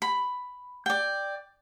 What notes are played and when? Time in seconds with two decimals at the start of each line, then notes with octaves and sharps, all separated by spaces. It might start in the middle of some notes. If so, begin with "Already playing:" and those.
0.02 B5
0.86 D5 G5